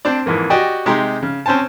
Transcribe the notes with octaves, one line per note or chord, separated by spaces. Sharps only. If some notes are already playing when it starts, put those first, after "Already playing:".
C4 D4 D5
F2 G#2 E3 A#3
F#4 G4 D5 D#5 G5 G#5
C3 G#3 D#4 G4 A#5 C6
C#3
C4 C#4 C5 G#5 A5